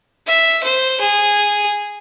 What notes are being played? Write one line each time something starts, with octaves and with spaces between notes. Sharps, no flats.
E5
C5
G#4